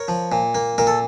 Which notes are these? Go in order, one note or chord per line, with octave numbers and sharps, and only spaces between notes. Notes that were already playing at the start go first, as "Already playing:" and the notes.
Already playing: A#4 C#5
F3
A#2
A#3
A#2 A#4
A4